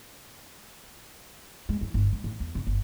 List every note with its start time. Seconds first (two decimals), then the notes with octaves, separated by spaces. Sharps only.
1.69 G#3
1.81 E3
1.94 G1
2.13 G#2
2.24 A1
2.40 E2
2.55 F1
2.67 G1